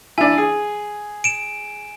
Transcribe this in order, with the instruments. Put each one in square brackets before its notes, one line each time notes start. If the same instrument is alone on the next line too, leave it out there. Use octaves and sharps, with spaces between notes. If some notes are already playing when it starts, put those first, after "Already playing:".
[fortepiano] D4 E4 [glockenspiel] G#5
[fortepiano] G#4
[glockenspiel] D7 E7